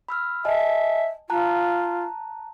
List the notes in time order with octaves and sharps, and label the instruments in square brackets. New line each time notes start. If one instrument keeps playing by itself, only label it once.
[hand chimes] B5 E6 F6
[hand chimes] D#5 G#5 A5 [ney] E5
[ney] F4 [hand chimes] A5 A#5 F#6